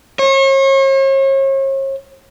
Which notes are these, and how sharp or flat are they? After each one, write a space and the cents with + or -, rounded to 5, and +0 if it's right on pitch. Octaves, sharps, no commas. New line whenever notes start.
C#5 -40